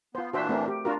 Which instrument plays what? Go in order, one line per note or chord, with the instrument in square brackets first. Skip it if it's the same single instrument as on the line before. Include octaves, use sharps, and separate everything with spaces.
[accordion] B3 [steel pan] F4 C5
[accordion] A#2 E3 D4 [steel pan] F#4 C5 E5
[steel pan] A3 C4 A#4
G4
[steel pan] D4 F4 A#4 [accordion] F#4